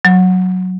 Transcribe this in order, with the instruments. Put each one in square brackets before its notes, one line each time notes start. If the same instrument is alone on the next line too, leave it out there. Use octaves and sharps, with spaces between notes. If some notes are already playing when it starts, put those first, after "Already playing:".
[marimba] F#3